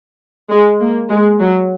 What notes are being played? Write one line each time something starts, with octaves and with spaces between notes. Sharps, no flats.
G#3
A#3
G#3
F#3